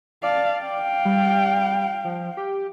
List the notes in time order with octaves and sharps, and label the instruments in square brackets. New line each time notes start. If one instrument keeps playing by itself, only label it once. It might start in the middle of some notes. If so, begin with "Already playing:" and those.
[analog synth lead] D5 [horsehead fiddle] F5 A5
[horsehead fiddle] F5 G5
[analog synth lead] G3
F3
G4